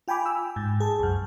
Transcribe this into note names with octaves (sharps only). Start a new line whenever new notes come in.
F4 G5 G#5 B5 D6
E6
G#2
G#4 A5
C2 F#2